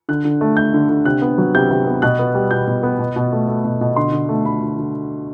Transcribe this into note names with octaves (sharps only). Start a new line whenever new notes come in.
D3 F#6
D3
A3
A3 G6
D3
D3
C3 F#6
B3
F#3
C3 G6
C3
B3
B2 F#6
B3
G3
B2 G6
B2
B3
B2
B2
A3
A3
B2
B2
D3 C6
D3
A3
A3 B5
D3
D3